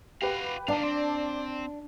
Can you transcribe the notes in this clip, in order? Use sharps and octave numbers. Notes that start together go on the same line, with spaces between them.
F#4 G4 B4 F5
D4 D#4 D5 F5 A5
C4